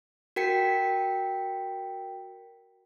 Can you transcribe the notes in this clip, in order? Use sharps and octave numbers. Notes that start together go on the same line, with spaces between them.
F#4 A#4 G5 B6 C#7